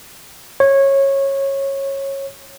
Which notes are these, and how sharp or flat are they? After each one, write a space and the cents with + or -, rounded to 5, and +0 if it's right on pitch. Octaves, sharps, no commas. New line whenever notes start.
C#5 -20